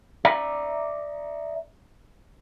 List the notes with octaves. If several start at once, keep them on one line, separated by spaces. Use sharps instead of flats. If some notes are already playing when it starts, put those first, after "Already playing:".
D5 E5 A#5